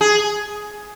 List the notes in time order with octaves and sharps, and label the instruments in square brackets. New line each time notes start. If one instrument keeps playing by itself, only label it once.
[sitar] G#4